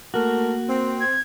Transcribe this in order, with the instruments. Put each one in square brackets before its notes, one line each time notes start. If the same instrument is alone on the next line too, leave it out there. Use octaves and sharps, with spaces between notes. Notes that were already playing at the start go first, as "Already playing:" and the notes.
[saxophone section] A3 A#4 [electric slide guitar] A#3 F#4
[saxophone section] C4
[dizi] G#6